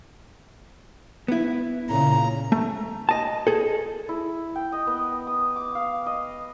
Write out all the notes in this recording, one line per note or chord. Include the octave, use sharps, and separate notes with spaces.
B3 E4
A#2 C#3 A#5
A3
D#5 A5
G#4 A4
E4
G5
D#5
B3
D#6
D6
F5
D#5